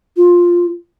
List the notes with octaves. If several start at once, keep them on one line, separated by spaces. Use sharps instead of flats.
F4